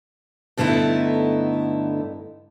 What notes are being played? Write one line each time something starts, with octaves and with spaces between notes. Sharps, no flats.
G2 D3 A3 B3 D#4 E4